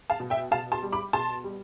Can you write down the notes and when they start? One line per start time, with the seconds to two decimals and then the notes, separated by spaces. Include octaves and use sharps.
0.10 F5 A5
0.20 B2
0.30 E5 G5
0.51 B2 F5 A5
0.72 A5 C6
0.83 G3
0.92 B5 D6
1.13 B2 A5 C6
1.44 G3